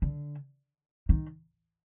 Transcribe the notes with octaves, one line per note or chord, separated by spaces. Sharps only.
D3
D#3